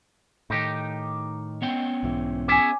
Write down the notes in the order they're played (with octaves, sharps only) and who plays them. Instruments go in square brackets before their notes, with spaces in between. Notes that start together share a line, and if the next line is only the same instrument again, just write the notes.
[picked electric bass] A2 D#3 [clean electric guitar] D#4 G4
[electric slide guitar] B3 C#4 G5
[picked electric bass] B1 G#2 E3
[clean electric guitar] G#4 C#5 E5 [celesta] G#5 D6